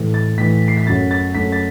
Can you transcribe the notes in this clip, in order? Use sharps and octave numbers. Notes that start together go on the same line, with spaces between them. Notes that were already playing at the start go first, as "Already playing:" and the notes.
Already playing: A2 E3 A3
A6
A2 E3 A3 B6
C7
B6
F#2 F#3 A3 A6
A6
F#2 F#3 A3 B6
A6